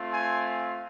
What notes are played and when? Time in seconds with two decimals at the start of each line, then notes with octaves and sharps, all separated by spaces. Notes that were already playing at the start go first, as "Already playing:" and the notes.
Already playing: A3 C4 F4
0.11 G#5